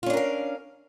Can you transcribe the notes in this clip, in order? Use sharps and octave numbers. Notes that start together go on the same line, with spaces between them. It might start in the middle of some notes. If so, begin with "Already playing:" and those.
C#4 D4 F4 A#4 F5